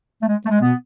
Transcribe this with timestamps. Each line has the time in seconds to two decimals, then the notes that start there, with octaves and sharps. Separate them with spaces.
0.22 A3
0.28 G#3
0.45 A3
0.50 G#3
0.61 B2 B3